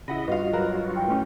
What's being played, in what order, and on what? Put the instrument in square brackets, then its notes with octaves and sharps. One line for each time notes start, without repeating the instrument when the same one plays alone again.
[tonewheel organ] C#3 D#5 [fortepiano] E4 F#5 B5
[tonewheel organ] G2 F4 F#4 [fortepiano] B3 F5 [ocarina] D#5
[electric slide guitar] F#3 B4 [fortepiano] A#4
[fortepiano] E3 [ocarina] G5
[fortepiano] E3 [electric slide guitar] A3 C#4